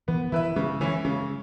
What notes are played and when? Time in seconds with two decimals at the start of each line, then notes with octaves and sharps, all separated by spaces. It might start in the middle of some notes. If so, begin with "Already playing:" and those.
0.08 E3 B3
0.32 E3 E4 B4 E5
0.56 C#3 G#3
0.80 E3 G#3 C#4 E4
1.05 C#3 G#3